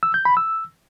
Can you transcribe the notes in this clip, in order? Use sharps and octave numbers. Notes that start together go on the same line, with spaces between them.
E6
G6
B5
E6